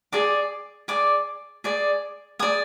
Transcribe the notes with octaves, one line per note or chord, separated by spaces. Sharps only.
G#4 D5 D6
G#4 D5 D6
G#4 D5
G#4 D5 D#6